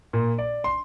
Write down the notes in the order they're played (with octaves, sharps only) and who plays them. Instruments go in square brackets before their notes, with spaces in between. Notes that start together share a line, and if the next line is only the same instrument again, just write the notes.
[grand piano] A#2
D5
C6